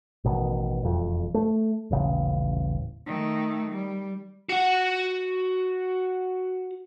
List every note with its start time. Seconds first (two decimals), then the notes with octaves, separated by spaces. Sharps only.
0.24 A1 B2 D#3
0.83 E1 F2
1.34 A3
1.90 D#1 A1 C#3
3.06 D#3 A3
3.70 G3
4.49 F#4 F#5